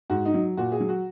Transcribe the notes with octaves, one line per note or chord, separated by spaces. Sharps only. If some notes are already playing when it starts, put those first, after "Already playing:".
G#2 F#4
D#4
F#3
A#2 F#4
G#4
F#3
F#4